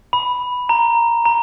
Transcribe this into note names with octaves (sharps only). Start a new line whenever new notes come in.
B5
A#5
A#5